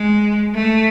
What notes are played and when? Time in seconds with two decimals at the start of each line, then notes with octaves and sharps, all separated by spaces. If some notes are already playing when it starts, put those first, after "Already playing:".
Already playing: G#3
0.54 A3